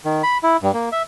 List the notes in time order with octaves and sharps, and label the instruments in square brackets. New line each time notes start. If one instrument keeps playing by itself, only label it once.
[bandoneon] D#3
B5
E4
G2
A#3
E5